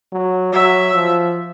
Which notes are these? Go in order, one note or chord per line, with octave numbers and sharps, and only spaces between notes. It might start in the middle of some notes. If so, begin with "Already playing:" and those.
F#3
F#3 E5
F3